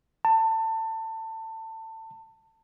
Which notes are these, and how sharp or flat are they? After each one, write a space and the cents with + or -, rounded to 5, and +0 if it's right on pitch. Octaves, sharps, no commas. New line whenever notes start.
A5 +25